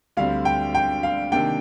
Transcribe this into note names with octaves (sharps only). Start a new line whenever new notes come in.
D2 D3 G3 C4 F5
G5
G5
F5
C3 D#3 A#3 D4 G5